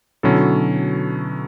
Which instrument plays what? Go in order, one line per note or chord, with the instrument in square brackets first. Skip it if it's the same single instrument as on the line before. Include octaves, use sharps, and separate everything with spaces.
[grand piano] B2 D3 [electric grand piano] F#3 C#4 E4 A4